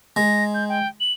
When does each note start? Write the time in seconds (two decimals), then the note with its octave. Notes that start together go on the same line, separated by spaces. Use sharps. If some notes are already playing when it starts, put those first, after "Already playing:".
0.16 G#3 A#6
0.54 G6
0.69 G5
1.00 F#7